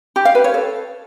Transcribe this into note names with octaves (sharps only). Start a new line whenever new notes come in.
G4
F5
B4
C#5
A4